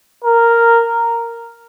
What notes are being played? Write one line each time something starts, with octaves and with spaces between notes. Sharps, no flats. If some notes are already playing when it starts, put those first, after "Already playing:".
A#4